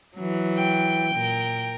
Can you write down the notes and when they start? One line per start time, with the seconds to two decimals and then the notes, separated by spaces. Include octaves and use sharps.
0.15 E3 F#3
0.58 G5
1.14 A#2 A#4